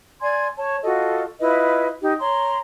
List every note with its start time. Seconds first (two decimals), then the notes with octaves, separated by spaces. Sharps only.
0.20 D5 G#5 C6 G#6
0.57 C#5 A5
0.84 F4 F#4 A4 D#5
1.40 E4 F4 B4 D#5
2.01 D#4 G4
2.21 C#5 A#5 C6